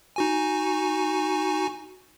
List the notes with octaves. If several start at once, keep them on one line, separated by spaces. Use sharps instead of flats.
D#4 F#4 G#5